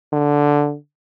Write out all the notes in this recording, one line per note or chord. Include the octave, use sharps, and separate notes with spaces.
D3